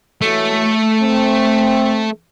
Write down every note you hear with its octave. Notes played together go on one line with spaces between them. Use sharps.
E3 A3 F#4 C#5
C4